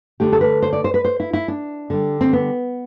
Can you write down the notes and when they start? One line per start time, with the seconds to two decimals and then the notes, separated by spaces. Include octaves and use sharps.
0.20 D3 A3 G4
0.32 A4
0.41 B4
0.62 C5
0.73 D5
0.84 C5
0.94 B4
1.04 C5
1.20 E4
1.33 E4
1.48 D4
1.90 D3 G3
2.21 C4
2.33 B3